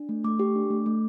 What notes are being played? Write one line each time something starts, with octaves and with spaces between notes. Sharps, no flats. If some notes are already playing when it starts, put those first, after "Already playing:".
Already playing: D4
A3
A3 D6
G4
D4
A3
A3